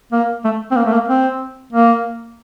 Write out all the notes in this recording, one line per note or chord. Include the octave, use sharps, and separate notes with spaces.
A#3
A3
C4
A#3
A3
A#3
C4
A#3